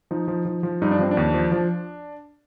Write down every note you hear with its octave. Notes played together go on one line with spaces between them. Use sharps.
F3 D#4
F3
F3
F3
G2 D#4
D4
F3 C4
D4
D#2
F3
F3